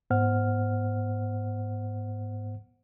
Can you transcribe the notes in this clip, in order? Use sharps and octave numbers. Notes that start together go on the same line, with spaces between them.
G#2 B3 C5 F#5 F6